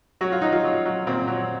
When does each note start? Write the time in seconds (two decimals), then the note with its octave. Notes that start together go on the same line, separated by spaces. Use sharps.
0.21 F#3 F#4
0.32 F4
0.42 F#3 D#4
0.53 F4
0.64 F#3
0.86 F#3
1.07 A#2 C4
1.28 F#3